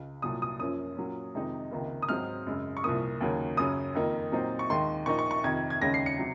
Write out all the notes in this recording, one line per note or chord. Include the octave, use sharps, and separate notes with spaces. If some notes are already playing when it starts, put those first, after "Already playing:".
Already playing: C#2
C2 A#2 F#3 D#6
D#6
F#2 F3 A#3 C#4 D#6
A#2 F#3 A#3 C#4
F2 C3 D#3 G#3 D#4
C#2 C3 D#3 A#3
D#6
G#2 F#3 C4 F6
F#2 C#3 G#3
C#6
C2 A#2 F3 A#3 D#6
D#2 C#3 F#3 A#3 C#4
F#2 C#3 F#3 C#4 D#6
F2 D#3 A#3 D#4
A#2 F#3 C4 D#4
C#6
D#2 D#3 G#3 C6
A#2 F3 A#3 D#4 C#6
C#6
C#6
F2 C3 D#3 G#6
G#6
D#2 C#3 G#3 C#4 A#6
C7
C#7
C3 F#3